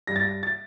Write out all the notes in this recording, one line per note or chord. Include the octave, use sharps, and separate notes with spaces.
G2 A#6
A6
A#6
A6